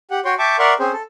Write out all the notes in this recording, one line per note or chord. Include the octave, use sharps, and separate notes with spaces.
G4 F#5
F#4 C#5 G5 C6
E5 G5 A5 C#6 D6
A#4 D5 E5 F#5 C6 C#6
C4 C#4 G#4 C5
A4